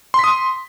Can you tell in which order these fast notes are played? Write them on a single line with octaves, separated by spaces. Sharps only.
C6 B6 D#6